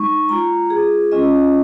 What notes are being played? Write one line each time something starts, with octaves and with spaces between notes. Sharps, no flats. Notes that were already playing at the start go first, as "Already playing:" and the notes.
Already playing: G#3 D#4 C#6
G#3 F4 A#5
G#4
G#3 C#4 F4 D#5